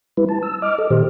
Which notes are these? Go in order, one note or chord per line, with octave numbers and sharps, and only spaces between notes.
G3 E4 B4
A5
E6
D#5 D6 F6
A4 D#5
A#2 D#3 G4 C5